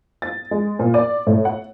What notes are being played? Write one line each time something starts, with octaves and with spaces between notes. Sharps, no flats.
A6
G#3
A#2
D5
A2
F#5